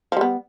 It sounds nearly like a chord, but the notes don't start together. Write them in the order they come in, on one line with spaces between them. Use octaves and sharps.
F3 G3 B3